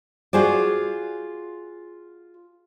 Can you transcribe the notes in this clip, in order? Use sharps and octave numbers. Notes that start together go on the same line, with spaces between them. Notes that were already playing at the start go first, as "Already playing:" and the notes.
F4 F#4 G#4 C5 D5